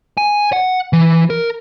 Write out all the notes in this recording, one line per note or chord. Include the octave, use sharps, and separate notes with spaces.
G#5
F#5
E3
A#4